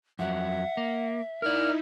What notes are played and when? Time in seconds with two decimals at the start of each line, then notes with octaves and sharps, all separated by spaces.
0.19 F2 F#3 E5 F#5
0.77 A#3
1.42 D#4 E4 A#4 D5 F6